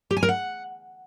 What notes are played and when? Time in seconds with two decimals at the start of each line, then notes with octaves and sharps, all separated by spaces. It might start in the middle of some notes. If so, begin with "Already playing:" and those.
0.11 G4
0.17 G#5
0.23 A#4
0.29 F#5